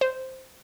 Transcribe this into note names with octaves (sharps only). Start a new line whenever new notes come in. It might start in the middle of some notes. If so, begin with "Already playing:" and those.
C5